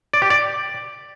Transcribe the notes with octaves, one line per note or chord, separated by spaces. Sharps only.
D5
G4
D5